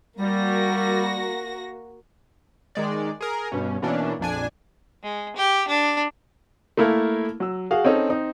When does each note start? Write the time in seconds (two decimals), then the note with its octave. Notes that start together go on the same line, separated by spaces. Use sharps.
0.19 G3 A#3 F#4 A#6
2.75 D#3 G#3 D5
3.21 G#4 A#4
3.52 G2 B2 C#4
3.82 B2 E3 A#3 C#4 D4
4.19 A#1 F2 D4 G#5
5.03 G#3
5.37 G4
5.68 D4
6.77 A3 A#3 E4 A4 A#4
7.40 F#3 E6
7.71 F#4 G#4 F5
7.85 C4 C#4 D#4 A4
8.09 C4 D#4